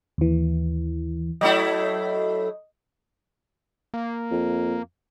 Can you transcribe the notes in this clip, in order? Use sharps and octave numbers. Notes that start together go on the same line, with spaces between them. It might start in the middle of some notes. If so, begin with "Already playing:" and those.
D#2 E3
F#3 A3 E4 D#5
A#3
F2